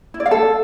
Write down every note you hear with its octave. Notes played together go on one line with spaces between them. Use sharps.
E4
D5
F5
A4